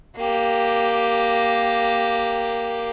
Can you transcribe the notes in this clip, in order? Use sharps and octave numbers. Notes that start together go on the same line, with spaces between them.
A#3 G4